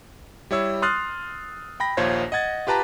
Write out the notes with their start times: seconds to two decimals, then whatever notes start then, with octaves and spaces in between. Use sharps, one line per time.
0.51 G3 E4 C#5 E6
0.82 C6 D#6 F6 F#6 A6 C7
1.80 G5 B5 A#6
1.97 A#1 D#2 F4 C5 C#5 G#6
2.32 D#5 F#5 G#6 A6
2.67 F4 G4 B4 A5 A#5